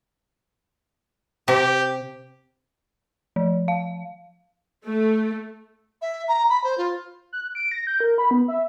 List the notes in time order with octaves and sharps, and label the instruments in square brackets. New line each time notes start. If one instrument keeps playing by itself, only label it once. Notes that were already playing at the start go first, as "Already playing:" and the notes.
[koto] C3 [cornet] G4
[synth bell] F3
F5
[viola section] A3
[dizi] E5
A#5
B5
C5
F4
[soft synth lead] F#6
D7
A#6
G6
A#4
B5
B3
E5